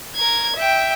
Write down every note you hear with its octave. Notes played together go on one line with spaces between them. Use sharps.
A#4 G#6
E5 G5